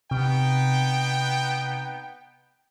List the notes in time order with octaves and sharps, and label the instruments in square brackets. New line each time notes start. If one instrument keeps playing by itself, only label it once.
[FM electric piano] C3 [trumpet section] B3 D#4 G5